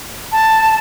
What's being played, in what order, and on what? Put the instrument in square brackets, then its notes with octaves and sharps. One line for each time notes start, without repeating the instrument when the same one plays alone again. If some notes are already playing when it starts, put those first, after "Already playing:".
[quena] A5